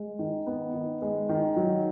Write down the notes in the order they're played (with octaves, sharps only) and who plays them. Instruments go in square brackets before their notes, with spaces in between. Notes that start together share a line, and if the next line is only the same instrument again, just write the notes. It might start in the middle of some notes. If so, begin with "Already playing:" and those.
Already playing: [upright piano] G#3
D#3
B3
D#3
G#3
D#3
F#3